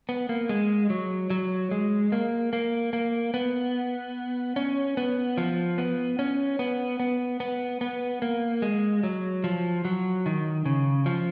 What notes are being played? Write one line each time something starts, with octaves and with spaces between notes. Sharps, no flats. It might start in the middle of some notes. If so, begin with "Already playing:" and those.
B3
A#3
G#3
F#3
F#3
G#3
A#3
A#3
A#3
B3
C#4
B3
F3
B3
C#4
B3
B3
B3
B3
A#3
G#3
F#3
F3
F#3
D#3
C#3
F3